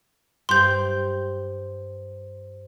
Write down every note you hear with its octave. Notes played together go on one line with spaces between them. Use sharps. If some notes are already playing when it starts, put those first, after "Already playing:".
G2 G4 C5 C6 G6